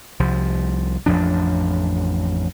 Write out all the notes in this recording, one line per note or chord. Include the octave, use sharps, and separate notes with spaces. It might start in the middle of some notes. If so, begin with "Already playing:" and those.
C2 F3
A1 F2 F3 D4